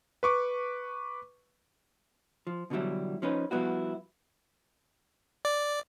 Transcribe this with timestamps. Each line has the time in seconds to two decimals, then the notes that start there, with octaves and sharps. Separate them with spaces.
0.23 B4 C#6 D6
2.47 F3
2.70 B2 D3 E3 F#3 G3 E4
3.22 F3 C#4 D#4 B4
3.51 F3 G3 B3 E4 F#4
5.45 D5